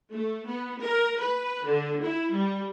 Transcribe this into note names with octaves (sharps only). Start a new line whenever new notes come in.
A3
B3
A#4
B4
D3
E4
G3